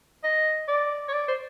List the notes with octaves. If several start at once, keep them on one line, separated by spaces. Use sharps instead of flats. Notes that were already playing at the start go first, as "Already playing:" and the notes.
D#5
D5
C#5
D5
C5